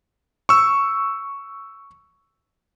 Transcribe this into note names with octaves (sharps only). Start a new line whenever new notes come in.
C#6 E6